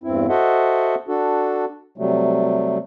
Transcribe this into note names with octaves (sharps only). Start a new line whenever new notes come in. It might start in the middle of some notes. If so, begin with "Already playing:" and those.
E2 G2 C4 E4
F#4 A4 C5 D#5 E5 F#5
D4 F#4 A4
C3 F#3 G3 A3